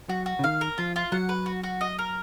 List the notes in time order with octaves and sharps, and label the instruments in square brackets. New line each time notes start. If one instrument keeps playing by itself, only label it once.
[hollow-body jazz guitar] F#3 [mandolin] F#4
[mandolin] F#4
[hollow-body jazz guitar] C#3
[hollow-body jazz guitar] D#3 [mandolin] F5
[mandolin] A#4
[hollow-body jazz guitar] F3 [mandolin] F4
[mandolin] F4
[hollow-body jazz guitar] F#3 [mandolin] F#5
[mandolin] B4
F#4
F#4
D#5
A#4